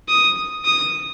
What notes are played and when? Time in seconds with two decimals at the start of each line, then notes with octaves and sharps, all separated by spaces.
0.09 D#6
0.65 D#6